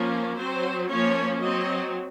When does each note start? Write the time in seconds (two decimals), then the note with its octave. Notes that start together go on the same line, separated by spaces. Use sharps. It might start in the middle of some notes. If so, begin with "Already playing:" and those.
Already playing: F3 A#3 C#4
0.37 F#3 C4 C5
0.89 F3 A#3 C#4 C#5
1.41 F#3 C4 D#5